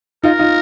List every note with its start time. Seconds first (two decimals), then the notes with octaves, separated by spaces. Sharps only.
0.24 D#4 F4 A#4
0.39 D#4 F4